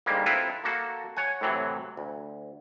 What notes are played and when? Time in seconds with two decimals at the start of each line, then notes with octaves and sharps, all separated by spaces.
0.06 G#2 D3 G3 G#3 A#3
0.26 C4 E4 F4 A4 B4
0.64 A#3 F#4 A4
1.17 C#5 F#5 G#5
1.41 A2 C3 E3 F#3
1.97 D2